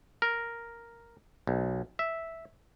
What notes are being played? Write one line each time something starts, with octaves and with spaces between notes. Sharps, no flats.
A#4
B1
E5